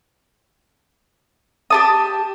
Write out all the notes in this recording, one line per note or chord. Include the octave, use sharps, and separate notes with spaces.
G4 A5 D#6